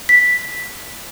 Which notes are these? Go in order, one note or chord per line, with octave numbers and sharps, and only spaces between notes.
B6